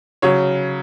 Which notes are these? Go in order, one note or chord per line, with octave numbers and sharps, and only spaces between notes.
C#3 F#3 C#5